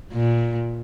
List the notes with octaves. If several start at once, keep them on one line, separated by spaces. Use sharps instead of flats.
A#2